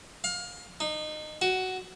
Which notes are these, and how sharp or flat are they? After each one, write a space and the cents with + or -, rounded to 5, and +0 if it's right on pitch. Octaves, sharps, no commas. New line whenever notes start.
F5 +25
D#4 -25
F#4 +10